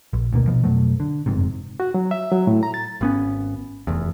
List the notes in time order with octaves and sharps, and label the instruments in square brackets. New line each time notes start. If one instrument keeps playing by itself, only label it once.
[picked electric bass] A#1
D2 B2 A#3
B2 F3
F2 B2 F#3 A3
D3
F#1 F2 G#2 C3
[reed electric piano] F#4
F#3
E5
F#3
A2
A#5
A6
[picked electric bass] G#1 B3 C#4
F1 E2